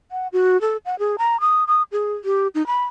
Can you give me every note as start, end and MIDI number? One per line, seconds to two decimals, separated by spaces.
0.11 0.28 78
0.33 0.60 66
0.61 0.77 69
0.86 0.98 78
0.99 1.16 68
1.18 1.40 82
1.40 1.67 87
1.67 1.82 87
1.92 2.14 68
2.25 2.48 67
2.55 2.65 63
2.67 2.84 83